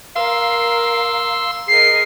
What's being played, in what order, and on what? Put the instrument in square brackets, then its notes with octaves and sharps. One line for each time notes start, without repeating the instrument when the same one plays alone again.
[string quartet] A#4 [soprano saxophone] F5 [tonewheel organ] C6 E6
[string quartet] G#4 A#4 D#5 [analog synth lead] C7